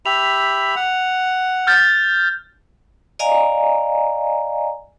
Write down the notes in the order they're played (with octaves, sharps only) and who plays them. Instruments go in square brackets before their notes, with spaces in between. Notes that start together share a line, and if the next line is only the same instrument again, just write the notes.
[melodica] G4 E5 B5 [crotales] F7
[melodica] F#5
[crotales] F6 G6 A6
[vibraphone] D5 D#5 F5 G#5 A#5